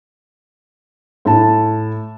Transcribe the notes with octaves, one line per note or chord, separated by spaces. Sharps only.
A2 A5